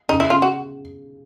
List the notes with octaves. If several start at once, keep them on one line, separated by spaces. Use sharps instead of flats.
C#3 D#4
E4
C#3 F4
F#4